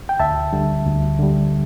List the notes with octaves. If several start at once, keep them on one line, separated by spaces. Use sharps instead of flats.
G5
D2 E5 A5
D3 G3
D2
D3 G3